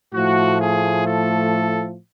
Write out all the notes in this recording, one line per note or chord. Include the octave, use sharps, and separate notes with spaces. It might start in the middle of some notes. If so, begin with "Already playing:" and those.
A2 F3 A3 F#4
G#4
A4